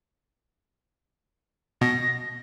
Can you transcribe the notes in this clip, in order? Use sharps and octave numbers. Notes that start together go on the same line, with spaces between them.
B2 A#6